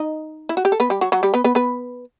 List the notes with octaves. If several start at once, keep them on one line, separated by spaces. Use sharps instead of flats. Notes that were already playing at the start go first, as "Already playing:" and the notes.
Already playing: D#4 D#5
E4
F#4
G4
A4
B3 B4
G3 G4
F#3 F#4
F#3 F#4
G3 G4
B3 B4
B3 B4
B3 B4